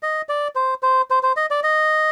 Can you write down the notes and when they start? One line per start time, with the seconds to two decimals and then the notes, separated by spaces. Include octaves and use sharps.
0.03 D#5
0.29 D5
0.56 C5
0.83 C5
1.10 C5
1.23 C5
1.37 D#5
1.51 D5
1.64 D#5